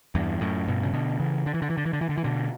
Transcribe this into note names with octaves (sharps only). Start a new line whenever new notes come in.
E2 G2
F#2 A2
G2 B2
C#3
B2 D3
C#3 E3
D3
E3
D3
E3
D3
E3
D3
E3
D3
E3
B2 D3